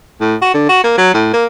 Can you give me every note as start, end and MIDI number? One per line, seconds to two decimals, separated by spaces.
0.21 0.36 45
0.42 0.53 66
0.54 0.64 50
0.69 0.81 66
0.84 0.96 58
0.98 1.11 54
1.14 1.28 45
1.33 1.45 58